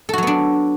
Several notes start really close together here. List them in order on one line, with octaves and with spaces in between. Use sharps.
A4 F#4 F#3 B3 D4